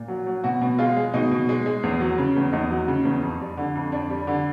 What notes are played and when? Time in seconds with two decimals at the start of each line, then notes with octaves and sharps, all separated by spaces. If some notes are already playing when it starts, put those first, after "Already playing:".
Already playing: A#2
0.08 F#3
0.27 F#3
0.44 B2 F#4
0.61 B2
0.78 G#3 F4
0.97 G#3
1.14 B2 D#4
1.31 B2
1.49 G#3
1.66 G#3
1.83 E2
2.00 F#3
2.18 C#3
2.36 E2
2.53 E2 D#4
2.71 F#3
2.88 C#3
3.05 E2
3.23 F2
3.41 G3
3.57 D3
3.75 F2
3.92 F2 D4
4.10 G3
4.27 D3